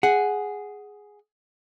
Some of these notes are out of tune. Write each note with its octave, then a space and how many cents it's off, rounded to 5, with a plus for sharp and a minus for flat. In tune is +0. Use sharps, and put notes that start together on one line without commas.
G#4 +0 F#5 +0